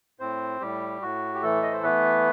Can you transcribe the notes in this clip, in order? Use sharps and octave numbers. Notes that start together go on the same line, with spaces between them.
A2 C4 C5
A2 G3 G4
A2 F#4
G4
E3 A3 A4
D#5
C5
A3 B3 B4